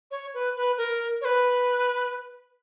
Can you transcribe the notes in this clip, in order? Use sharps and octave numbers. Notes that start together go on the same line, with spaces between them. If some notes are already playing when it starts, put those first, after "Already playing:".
C#5
B4
B4
A#4
C#5
B4